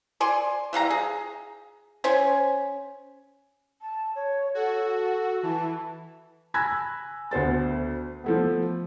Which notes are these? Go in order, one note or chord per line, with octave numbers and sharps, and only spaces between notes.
D5 G#5 C6
E3 G3 F5 A#5
G#4
C#4 C5 G#5
A5
C#5
F#4 A4
E3 A5
G#5 B5 E6 F#6 G#6 A#6
D2 B3 C5 A6
F3 A3 B3